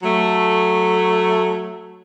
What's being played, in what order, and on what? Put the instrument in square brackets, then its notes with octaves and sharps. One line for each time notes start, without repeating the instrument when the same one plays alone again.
[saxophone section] F#3 A3